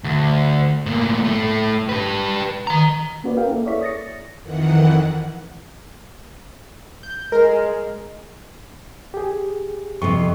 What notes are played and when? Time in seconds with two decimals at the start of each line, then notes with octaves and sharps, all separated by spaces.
0.04 D2
0.86 A2 A#3
1.24 A2 A3
1.89 G4 B4
2.67 D#3 A#5
3.24 A#3 C#4 F#4 B4 D5
3.37 G#4 A#4 B4 F5 G5
3.49 A#3 E4 G#4 A4
3.66 C#5 D5 E5 C#6 B6
3.81 D#6 A6 A#6 C#7
4.41 F2 D#3 E3 F#5
7.03 G6
7.32 G#3 A#4
9.14 G4 G#4
10.02 F2 C3 C#6